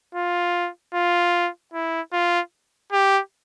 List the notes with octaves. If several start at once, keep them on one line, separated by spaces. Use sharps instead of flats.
F4
F4
E4
F4
G4